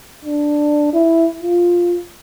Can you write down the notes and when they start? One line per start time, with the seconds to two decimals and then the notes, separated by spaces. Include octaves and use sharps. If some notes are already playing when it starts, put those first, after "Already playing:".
0.25 D4
0.93 E4
1.43 F4